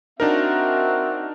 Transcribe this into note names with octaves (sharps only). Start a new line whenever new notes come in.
C4 D4 D#4 F#4 A#4 E5